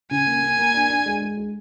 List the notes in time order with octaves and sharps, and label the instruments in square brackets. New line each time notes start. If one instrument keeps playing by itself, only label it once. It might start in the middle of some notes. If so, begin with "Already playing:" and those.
[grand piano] C#3 [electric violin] G#5
[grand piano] A#3
A#3
A#3
D4
D4
G#3
G#3
G#3